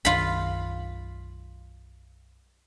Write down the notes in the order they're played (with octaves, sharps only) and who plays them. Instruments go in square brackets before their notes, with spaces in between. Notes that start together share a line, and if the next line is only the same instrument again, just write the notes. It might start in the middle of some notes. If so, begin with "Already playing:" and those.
[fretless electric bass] B1 F#2 D#3 [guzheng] F4 B5